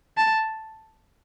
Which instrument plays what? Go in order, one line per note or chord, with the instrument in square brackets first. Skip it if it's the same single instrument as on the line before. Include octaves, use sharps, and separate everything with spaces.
[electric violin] A5